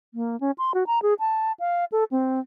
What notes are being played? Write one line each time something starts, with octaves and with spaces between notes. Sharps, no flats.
A#3
C#4
C6
F#4
A#5
G#4
A5
F5
A4
C4